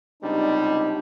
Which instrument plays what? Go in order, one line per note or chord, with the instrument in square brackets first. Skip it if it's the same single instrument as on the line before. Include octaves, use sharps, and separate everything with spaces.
[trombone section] C#2 C3 G3 [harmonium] D4 D#4